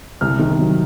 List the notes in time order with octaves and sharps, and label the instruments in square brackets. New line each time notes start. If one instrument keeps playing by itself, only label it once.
[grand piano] C2 F6
D#3
F#3